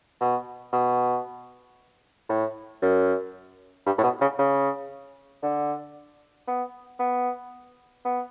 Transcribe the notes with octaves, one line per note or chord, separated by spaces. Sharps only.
B2
B2
A2
F#2
G2
A2
B2
C#3
C#3
D3
B3
B3
B3